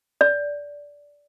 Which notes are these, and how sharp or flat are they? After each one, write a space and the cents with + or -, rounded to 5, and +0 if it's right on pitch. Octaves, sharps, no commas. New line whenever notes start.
D5 -15